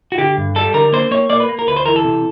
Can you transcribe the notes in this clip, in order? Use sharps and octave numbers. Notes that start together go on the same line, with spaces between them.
F#4
D3 G4
G2
G3 A4
D3 A#4
A#3 C5
A#3 C#5
A#3 D5
B4
A#3
A#4
D2 B4
C5
E3 A#4
A4
C3